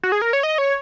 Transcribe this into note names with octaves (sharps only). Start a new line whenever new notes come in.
F#4
G#4
A#4
C#5
D#5
C#5